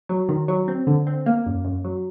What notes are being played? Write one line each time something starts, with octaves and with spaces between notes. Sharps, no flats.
F#3
D#3
F#3
C4
D3
C4
A#3
F#2
F#2
F#3